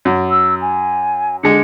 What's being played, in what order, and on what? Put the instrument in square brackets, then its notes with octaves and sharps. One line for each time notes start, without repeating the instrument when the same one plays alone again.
[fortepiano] F#2
[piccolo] E6
G#5
[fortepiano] D3 G#3 [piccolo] C#7